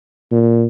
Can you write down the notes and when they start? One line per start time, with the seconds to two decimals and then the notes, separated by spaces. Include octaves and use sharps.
0.32 A#2